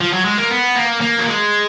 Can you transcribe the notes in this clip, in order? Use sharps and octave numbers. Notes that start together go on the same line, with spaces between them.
F3
F#3
G#3
A#3
B3
A#3
A#3
F#3
G#3